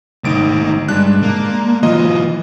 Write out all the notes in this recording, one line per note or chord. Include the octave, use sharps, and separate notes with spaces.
G#1 D2 D#4 D7
G2 G#3 D4 F#6
A#3
E3 F#3 F4 D#5